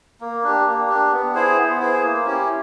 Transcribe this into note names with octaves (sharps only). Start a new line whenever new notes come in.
A#3
D4 G4
A#3
D4 G4
B3
E4 G#4 C5
B3
E4 G#4 C5
A#3
C#4 E4 G4